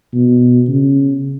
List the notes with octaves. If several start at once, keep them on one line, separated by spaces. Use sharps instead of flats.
B2
C#3